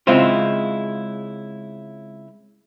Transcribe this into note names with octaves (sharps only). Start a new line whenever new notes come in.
C#3 G#3 C4 E4 F4